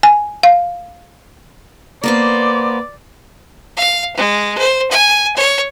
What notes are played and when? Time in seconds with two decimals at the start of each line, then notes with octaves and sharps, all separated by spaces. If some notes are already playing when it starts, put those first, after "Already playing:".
0.03 G#5
0.43 F5
2.04 A#3 B3 C5 D5
3.77 F5
4.16 G#3
4.58 C5
4.91 G#5
5.36 C#5